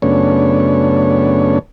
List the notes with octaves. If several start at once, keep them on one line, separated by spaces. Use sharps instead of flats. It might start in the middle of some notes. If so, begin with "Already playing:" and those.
F#2 C#3 A3 B3 D4 C#5